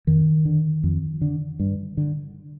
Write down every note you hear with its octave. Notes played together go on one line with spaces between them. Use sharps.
F2 D#3
D3
F2
D3
G2
D3